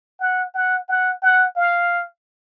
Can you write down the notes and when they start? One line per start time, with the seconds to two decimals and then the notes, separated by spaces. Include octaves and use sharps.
0.21 F#5
0.55 F#5
0.89 F#5
1.23 F#5
1.56 F5